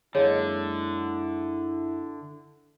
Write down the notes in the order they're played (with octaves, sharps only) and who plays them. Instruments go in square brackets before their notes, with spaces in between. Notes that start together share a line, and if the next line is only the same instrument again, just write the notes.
[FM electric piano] F#2 G#3 A#3 [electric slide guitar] D3 [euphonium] E4 [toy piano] C#5 D#5